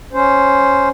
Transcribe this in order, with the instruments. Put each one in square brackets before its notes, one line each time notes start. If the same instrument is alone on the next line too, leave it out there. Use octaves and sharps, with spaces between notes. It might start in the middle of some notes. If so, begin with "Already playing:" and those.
[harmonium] C#4 C5